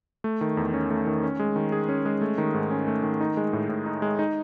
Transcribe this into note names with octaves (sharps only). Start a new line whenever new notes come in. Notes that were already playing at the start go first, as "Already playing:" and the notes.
A3
D#3
E2
C#4
A3
D#3
C#4
G#3
D#3
G#4
C#4
G#3
A3
D#3
G#2
C#4
A3
D#3
D#4
G#3
A2
A2
D#4
G#3
D#4